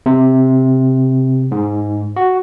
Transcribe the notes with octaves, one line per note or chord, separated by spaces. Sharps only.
C3
G#2
F#4